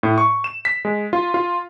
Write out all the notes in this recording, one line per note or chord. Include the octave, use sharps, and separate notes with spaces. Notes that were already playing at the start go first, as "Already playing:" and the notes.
A2
C#6
E7
B6
G#3
F4
F4